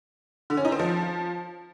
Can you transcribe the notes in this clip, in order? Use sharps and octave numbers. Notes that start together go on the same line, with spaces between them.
D3
C#4
D#4
C4
F3